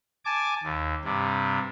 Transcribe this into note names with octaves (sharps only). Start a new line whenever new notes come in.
G#5 A5 D6
D#2
G2 C3